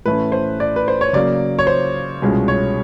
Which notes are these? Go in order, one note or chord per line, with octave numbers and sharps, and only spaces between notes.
A2 E3 A3 C#4 E4 B4
C5
D5
B4
C5
C#5
C#3 F#3 A#3 D5
C#5
C5
C2 B2 G#3 C#4 F4
C#5